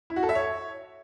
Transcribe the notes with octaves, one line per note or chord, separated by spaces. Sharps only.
E4
F#4
A4
E5
C#5